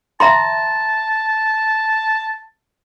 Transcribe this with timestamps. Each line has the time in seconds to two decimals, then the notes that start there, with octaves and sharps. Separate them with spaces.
0.20 E5 A5 A#5 C6